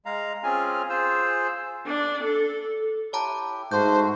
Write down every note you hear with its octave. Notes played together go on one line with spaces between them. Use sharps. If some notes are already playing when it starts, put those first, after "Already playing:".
G#3 F5 A#5
C4 C#4 F4 G#4 G#5 F6
F4 G#4 C5 E6
D4
A4
E4 G4 C#5 A5 A#5
G#2 A3 F#4 C5 G6